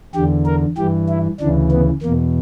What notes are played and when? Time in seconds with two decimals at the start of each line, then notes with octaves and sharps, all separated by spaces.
0.15 E2 D3 G4
0.46 A#4
0.77 G2 E3 G4
1.09 E4
1.40 D2 C#3 E3 D4
1.72 B3
2.02 E2 B2 A#3